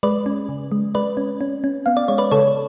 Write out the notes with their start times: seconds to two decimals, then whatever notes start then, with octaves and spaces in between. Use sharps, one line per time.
0.03 G#3 B4 D5
0.26 C#4
0.49 C#3
0.72 G#3
0.95 G#3 B4 D5
1.17 C#4
1.41 C#4
1.64 C#4
1.86 B3 F5
1.97 D5
2.08 G#3 C#5
2.18 B4 D5
2.31 C#3 A4 C#5